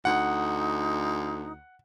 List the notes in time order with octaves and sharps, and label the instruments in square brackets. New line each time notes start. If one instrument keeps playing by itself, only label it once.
[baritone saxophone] D2 [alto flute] D#4 [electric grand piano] F#5